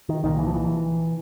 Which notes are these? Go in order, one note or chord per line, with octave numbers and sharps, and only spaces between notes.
D#3
C2 A#2 D#3
E3
F3
E3